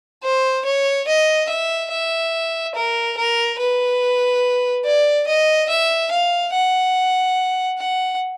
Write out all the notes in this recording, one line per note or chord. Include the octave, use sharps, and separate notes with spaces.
C5
C#5
D#5
E5
E5
A#4
A#4
B4
D5
D#5
E5
F5
F#5
F#5